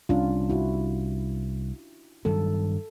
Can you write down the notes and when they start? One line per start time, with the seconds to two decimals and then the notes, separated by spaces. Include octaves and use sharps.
0.09 C2 C#4 D4 F4
0.50 E4 F#4
2.25 G2 D#3 F#3 A4